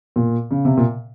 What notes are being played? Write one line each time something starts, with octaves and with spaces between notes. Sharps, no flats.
A#2
C#3
C3
A#2